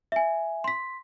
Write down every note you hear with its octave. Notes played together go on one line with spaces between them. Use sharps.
E5 G#5
C6 B6